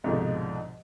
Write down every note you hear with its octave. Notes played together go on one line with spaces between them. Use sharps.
C2 G#2 B2 D3 F3